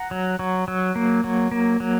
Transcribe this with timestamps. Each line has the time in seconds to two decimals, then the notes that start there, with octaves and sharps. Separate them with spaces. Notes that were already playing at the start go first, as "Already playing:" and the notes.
Already playing: F#5 A#5
0.11 F#3
0.39 F#3
0.68 F#3
0.96 A#3
1.24 F#3
1.51 A#3
1.80 F#3